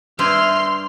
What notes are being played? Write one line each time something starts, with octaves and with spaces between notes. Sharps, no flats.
G2 E4 C5 C6 F6